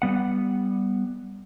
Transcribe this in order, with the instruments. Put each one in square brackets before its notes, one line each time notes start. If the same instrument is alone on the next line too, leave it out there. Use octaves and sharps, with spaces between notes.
[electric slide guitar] G3 B3 F#5